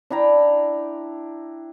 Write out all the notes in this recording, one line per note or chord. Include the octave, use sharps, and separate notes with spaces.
D4 E4 G5 A#5